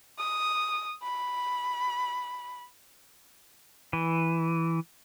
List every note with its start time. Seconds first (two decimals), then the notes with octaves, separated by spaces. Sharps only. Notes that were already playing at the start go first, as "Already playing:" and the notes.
0.18 D#6
1.02 B5
3.93 E3